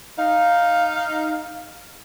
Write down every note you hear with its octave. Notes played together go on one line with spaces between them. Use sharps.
D#4 F5